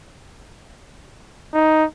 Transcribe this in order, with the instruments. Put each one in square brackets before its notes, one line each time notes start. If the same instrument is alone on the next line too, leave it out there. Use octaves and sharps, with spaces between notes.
[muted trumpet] D#4